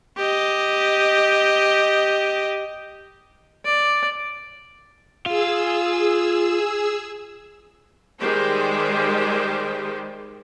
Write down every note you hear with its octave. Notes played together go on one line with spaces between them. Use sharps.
G4 D#5
D5
F4 G#4 E6
D#3 G3 G#3 G4 C5